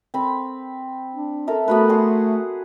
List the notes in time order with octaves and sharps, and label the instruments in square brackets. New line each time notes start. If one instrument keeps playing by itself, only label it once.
[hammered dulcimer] C4 B5
[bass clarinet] D4
[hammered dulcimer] A4 A#4 E5
[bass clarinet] A3 [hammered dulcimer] B3 F#4 B4
[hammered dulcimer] G#4 F#5 C6